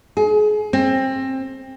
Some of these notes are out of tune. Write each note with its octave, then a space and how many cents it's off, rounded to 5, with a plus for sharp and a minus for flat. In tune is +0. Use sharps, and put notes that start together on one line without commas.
G#4 +30
C4 +25